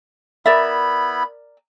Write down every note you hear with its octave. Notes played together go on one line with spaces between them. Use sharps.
B3 E4 A#4 D5 E5 B5